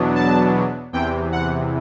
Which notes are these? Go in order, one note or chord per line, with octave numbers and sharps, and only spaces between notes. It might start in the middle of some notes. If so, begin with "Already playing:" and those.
Already playing: E2 B2 F#3 B3 D4
A5
E2 C3 E3 G5
F#5